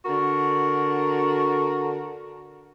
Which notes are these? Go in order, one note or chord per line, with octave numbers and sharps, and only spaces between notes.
D3 F#4 A#4